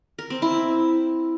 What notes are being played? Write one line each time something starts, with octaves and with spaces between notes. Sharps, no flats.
A#4
C4
E4